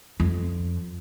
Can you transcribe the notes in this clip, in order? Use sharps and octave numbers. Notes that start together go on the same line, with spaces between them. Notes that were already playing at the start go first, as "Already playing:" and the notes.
F2